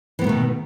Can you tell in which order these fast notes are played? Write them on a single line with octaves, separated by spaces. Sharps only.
E3 B3 A3 D#3 B2